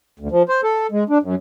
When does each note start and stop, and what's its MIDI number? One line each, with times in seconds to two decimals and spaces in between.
0.20 0.28 38
0.31 0.43 53
0.49 0.61 72
0.64 0.87 69
0.92 1.04 56
1.10 1.18 62
1.22 1.35 42